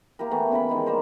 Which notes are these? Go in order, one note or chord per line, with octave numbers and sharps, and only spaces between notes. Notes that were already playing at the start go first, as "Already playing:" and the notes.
A#3 E4 G4 A#4
E3 A3 B3
C#3 E4 A#4 B5
D#3 G#3 E4
G3 A#3 A#4 C5